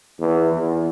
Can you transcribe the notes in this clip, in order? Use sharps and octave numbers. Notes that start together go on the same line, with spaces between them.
E2
E2